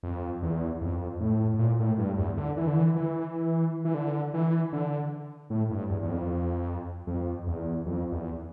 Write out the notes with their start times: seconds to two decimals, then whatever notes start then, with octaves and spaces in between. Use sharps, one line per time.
0.03 F2
0.42 E2
0.81 F2
1.20 A2
1.54 A2
1.59 A#2
1.79 A2
1.98 G2
2.18 E2
2.37 D3
2.57 E3
2.67 D3
2.76 E3
2.96 E3
3.85 E3
3.94 D3
4.34 E3
4.73 D3
5.50 A2
5.71 G2
5.89 E2
6.02 E2
6.09 F2
7.07 F2
7.47 E2
7.86 F2
8.12 E2